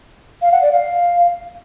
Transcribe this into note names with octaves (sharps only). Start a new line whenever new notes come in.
F5
F#5
D5
F5